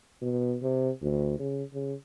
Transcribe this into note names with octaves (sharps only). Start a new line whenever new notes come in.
B2
C3
D2
C#3
C#3